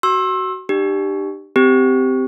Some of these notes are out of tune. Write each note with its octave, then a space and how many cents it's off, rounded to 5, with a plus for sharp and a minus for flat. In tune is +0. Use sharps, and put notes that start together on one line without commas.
F#4 +20 C6 +35 E6 +0
D4 +40 G4 +0
C4 -20 G4 +0